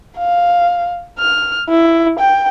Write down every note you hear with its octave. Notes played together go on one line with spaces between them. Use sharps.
F5
F6
E4
G5